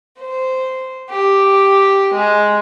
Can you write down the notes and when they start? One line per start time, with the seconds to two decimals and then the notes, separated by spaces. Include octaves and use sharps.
0.19 C5
1.11 G4
2.15 G#3